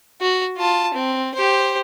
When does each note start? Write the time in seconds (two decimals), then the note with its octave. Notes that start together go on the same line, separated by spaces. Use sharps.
0.21 F#4
0.58 F4 A5
0.95 C4
1.34 G4 C5